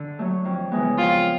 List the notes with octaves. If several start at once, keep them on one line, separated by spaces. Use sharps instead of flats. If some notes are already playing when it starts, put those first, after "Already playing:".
Already playing: D3
F#3 A3
F2
C#3 E3 G#3 B3
F2 F4